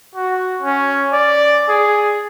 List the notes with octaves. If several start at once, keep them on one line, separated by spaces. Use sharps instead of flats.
F#4
C#4
D5
G#4